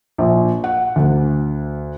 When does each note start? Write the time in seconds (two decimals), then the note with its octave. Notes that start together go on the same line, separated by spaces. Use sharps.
0.18 A#1
0.64 F#5
0.96 D2